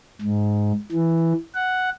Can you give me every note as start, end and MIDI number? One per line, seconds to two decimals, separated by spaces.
0.22 0.72 44
0.92 1.33 52
1.55 1.90 78